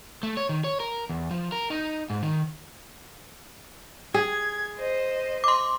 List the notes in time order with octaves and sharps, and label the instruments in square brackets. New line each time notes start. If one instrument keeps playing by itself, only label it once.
[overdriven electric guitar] A3
C#5
D#3
C#5
A#4
E2
F3
A#4
D#4
G#2
D#3
[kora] G#4 [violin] G#6
[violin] C5 D#5
[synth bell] C6 D6